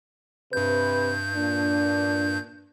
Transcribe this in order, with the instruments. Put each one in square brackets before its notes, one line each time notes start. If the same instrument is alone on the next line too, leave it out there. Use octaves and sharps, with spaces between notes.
[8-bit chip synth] G2 G6 [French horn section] C3 B4
[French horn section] A#2 D4